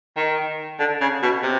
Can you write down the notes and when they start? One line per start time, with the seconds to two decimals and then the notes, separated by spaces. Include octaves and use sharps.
0.16 D#3
0.79 D3
1.01 C#3
1.22 B2
1.43 C3